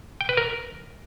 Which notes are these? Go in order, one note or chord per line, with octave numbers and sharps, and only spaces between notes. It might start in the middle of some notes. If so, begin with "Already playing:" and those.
G5
B4
A#4